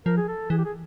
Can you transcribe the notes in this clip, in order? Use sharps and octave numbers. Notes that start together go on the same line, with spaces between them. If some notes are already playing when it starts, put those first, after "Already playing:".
F3 A#4
G#4
A4
E3 G#4
G4
G#4